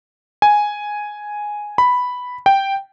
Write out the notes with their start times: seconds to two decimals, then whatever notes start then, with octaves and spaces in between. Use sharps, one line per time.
0.42 G#5
1.78 B5
2.46 G5